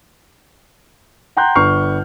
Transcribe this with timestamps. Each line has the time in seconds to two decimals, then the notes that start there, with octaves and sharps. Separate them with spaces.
1.37 F#5 G5 A#5 C6 F#6 G6
1.55 G1 D4 B4 C#6 F6 C7